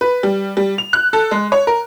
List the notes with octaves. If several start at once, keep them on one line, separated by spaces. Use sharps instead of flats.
B4
G3
G3
F7
F#6
A4
G#3
C#5
A#4